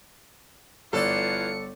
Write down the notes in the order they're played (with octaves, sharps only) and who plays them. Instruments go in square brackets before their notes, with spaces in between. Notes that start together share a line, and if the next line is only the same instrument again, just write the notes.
[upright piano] G1 D5 [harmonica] E3 F4 [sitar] A4 [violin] C#7